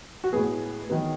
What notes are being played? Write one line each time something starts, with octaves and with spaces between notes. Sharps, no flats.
F#4
A2 G#3 B3 G#4
D#3 F#3 B3